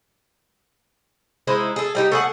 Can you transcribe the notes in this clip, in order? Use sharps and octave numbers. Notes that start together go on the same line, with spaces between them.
G#3 D#4 E4 C5
G#4 A4
G3 D#4 G4
A3 G#4 F#5